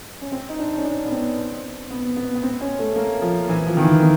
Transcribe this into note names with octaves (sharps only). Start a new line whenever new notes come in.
C#4
C4
D#4
D4
C#4
D4
B3
C4
C4
B3
B3
B3
C4
C#4
A3
A#3
F3
E3
F3
D#3
E3
D#3